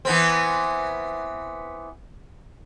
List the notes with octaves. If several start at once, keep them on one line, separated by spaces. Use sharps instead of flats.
E3 B3 C4